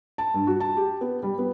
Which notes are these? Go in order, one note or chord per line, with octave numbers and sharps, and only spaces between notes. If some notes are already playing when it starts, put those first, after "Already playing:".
A5
G2
F#4
A5
G4
B3
G3
B3